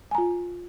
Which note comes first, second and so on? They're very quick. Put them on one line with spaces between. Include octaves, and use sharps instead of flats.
G#5 A#5 F4